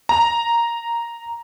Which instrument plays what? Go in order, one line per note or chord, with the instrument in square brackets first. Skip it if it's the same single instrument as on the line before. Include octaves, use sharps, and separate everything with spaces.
[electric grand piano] A#5